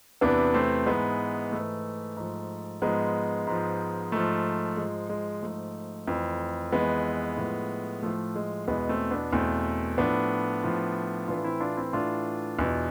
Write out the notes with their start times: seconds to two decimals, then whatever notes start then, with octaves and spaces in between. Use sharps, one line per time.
0.21 E2 C3 E3 B3 D4
0.54 A3 C4
0.86 G#2 E3 G#3 B3
1.52 G#2 E3 A3
2.17 G#2 F3
2.82 G#2 F3 G#3 B3
3.47 G#2 F3
4.12 G#2 F3 A3
4.77 G#2 F3 G#3
5.09 G#3
5.42 G#2 F3 A3
6.08 F2 E3
6.72 F2 E3 G#3 B3
7.38 A2 F3
8.03 A2 F3 A3
8.36 G#3
8.68 E2 B2 G#3 B3
8.89 A3 C4
9.11 B3 D4
9.33 E2 B2 A3 C4
9.98 A2 F3 B3 D4
10.63 A2 F3
11.28 A2 E3 D4 F4
11.44 C4 E4
11.60 D4 F4
11.77 C4 E4
11.93 A2 E3 D4 F4
12.59 E2 B2